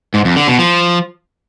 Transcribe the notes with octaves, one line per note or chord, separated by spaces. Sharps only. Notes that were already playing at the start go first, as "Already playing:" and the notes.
G#2
F2
D3
B2
F3